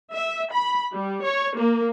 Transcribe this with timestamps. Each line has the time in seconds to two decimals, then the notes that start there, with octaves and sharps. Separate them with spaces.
0.12 E5
0.51 B5
0.92 G3
1.24 C#5
1.57 A#3